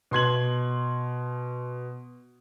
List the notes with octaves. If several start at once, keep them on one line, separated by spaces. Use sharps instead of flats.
B2 C6 G#6 F#7